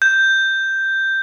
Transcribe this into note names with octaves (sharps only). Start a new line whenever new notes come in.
G6